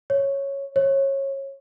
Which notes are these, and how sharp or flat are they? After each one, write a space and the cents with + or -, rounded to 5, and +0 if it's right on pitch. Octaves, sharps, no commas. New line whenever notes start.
C#5 -5
C#5 -25